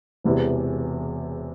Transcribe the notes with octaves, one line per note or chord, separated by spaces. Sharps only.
E1 E2 C3 E3